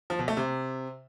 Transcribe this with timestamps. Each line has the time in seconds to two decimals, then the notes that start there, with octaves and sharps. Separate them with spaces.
0.10 F3
0.19 B2
0.28 A3
0.37 C3